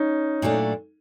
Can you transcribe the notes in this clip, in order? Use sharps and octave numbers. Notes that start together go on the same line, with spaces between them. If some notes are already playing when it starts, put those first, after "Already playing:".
Already playing: C#4 D#4
A#2 F#3 A3 D4